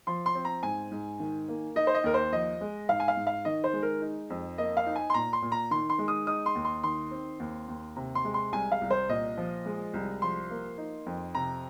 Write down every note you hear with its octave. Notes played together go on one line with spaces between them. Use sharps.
F3 C6
C6
C4
A#5
G#2 G#5
G#2
D#3
A#3
D#4 D#5
C5
D#5
D#2 A#4
C5
F3 D#5
G#3
G#2 F5
G#5
F5
G#2
F5
D#3 D#5
C5
G#3
A#4
D#4
F2
A#3 D#5
F5
D#4
G#5
C6
A#2 A#5
C6
A#2
A#5
D#3 C6
C6
G#3
D#6
D#4 D#6
C6
D#2
C6
D#3 C6
C4
D#2
D#2
C3
C6
G#3
C6
C2 G#5
F5
C2
C5
A#2 D#5
F3
G#3
C2
F3 C6
A#3
D#4
F2
C3 A#5